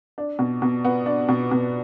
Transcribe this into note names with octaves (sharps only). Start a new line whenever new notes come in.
D4
B2
B2
B3
D4
B2
B2